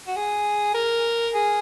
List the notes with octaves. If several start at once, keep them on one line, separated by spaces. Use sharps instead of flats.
F#4
G#4
A#4
G#4